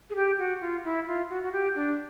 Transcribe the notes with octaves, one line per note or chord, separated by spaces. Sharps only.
G#4
G4
F#4
F4
E4
F4
F#4
F#4
G4
D4